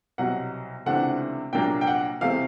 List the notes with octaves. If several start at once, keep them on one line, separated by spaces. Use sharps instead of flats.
C2 B2 F#3 F#5
C#2 C3 E3 A3 D4 F#5
C2 A#2 F#3 A#3 D4 G5
G5
F#5
E2 C3 E3 A3 F5